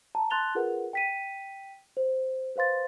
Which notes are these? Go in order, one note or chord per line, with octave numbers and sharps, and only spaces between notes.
A5 A#5
A5 C6 F#6 A6 F7 G7
F4 G#4 A#4 B4 F#5
G5 B6 D#7
C5
B4 C5 F5 C6 A6